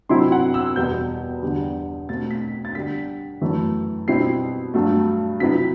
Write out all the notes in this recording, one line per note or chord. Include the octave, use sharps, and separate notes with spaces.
C3 F#3 C4 E4 C6
F#5
E6
E2 B2 G3 B3 G6
E2 D3 G3 D4
B2 A3 C4 A6
B6
A6
D3 G3 D4 B6
F#2 E3 A3
B2 G3 C4 E4 C7
G2 F#3 A3
C3 F#3 B3 E4 B6